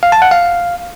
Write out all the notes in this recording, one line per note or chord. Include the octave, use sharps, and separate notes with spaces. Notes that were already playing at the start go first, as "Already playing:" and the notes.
F5
A5
F#5
F5